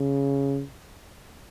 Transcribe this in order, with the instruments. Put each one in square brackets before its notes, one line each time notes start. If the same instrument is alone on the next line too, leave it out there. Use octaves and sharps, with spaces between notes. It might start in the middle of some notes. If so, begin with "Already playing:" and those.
Already playing: [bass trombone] C#3